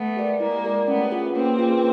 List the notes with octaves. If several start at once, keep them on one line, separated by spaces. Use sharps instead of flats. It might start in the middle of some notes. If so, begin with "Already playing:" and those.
Already playing: A3 B3
G4 A#4 D5
G#3 A#3 E4
G4 A#4 D5
A3 B3 C#4
F4 G#4 B4
A#3 C4 C#4
F4 G#4 B4